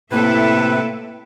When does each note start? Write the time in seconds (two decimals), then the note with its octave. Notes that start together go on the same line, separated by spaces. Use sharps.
0.11 A2 C3 A#3 E4 A4 B4 E5